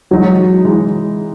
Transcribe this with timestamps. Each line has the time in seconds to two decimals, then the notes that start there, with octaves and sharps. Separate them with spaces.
0.11 E3 F#3 G#3 D#4
0.65 E3 G#3